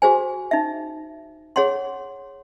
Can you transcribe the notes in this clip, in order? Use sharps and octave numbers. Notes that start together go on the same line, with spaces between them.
F#4 G#4 C5 G#5
D#4 E5
G#4 C#5 F#5 C6